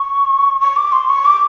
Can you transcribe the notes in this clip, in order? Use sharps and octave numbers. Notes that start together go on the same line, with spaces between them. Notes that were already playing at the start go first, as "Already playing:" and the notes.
Already playing: C#6
C#6
D6
C6
C#6
D6